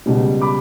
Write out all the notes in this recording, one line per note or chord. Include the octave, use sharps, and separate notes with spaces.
C#2 B2 G3
B5 D6